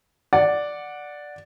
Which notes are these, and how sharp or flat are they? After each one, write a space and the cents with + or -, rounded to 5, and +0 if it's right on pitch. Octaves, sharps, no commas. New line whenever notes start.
D5 +0 F#5 -10